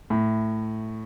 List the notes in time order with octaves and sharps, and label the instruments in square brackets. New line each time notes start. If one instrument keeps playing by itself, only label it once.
[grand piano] A2